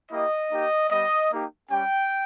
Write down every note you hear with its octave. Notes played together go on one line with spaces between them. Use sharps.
A#3 E4 G4 D#5
A#3 D#4 G4
G3 B3 G4 D#5
A#3 D#4 G4
G3 C#4 G4 G5